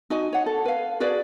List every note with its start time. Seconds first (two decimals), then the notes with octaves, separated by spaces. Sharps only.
0.10 D#4 F#4 D#5 G#5
0.33 C#5 F#5
0.46 A4
0.65 B4 F5
1.00 F#4 G#4 B4 D5